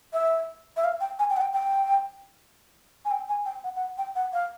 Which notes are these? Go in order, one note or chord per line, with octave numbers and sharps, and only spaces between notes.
E5
E5
F5
G5
G#5
G5
F#5
G5
G5
G#5
G5
G#5
G5
F#5
F#5
G5
F#5
F5